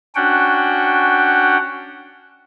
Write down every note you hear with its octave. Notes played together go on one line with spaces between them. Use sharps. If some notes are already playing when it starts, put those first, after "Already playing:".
C#4 D4 F#4 F#5 G5